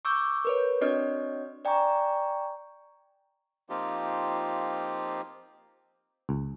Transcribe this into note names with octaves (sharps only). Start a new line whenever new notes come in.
C#6 D6 E6 G6
A#4 B4 C#5
C4 D4 F#4 C#5 D#5 F6
D5 G5 G#5 A#5 C#6
F3 A#3 C4 D#4 F4 G4
C#2